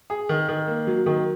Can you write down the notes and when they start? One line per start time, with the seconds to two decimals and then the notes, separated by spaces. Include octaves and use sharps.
0.10 G#4
0.29 D#3
0.48 D#3
0.67 A#3
0.87 F#3
1.06 D#3